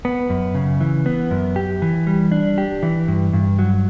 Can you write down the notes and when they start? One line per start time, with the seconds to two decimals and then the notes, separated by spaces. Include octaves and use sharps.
0.05 B3
0.30 F#2
0.55 C#3
0.80 E3
1.06 B3
1.31 F#2
1.56 G4
1.82 E3
2.07 G3
2.32 D4
2.58 G4
2.83 E3
3.08 G2
3.33 G2
3.59 F#3